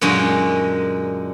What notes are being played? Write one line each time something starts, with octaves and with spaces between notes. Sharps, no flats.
F#2 A#2 D3 G#3 D#4